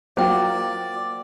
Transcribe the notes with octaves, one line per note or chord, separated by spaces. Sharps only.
F#3 A#3 F4 F#4 C5 D5 G5